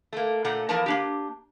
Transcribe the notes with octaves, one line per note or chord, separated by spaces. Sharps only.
A3 A#3
A#2 A3 A#3 F#5
E2 E3 F3 A#3 A#4 A5
A#3 D4 G4